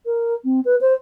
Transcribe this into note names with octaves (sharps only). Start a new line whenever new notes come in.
A#4
C4
B4
C5